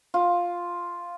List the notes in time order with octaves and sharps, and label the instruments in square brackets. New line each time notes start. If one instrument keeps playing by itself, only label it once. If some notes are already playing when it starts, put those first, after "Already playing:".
[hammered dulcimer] F4